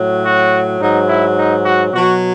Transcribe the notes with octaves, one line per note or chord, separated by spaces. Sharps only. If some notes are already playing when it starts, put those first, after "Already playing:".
Already playing: A2 F#3
F#4
G#2 F#3 D#4
E4
D#4
F#4
B2 F#3 F#4